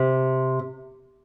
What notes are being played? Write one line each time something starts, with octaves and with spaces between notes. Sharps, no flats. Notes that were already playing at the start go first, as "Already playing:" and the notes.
Already playing: C3